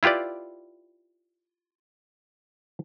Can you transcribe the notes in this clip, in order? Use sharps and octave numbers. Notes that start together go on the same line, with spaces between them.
E4 F4 G4 B4 D5